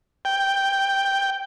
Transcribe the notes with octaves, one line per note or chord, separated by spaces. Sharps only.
G5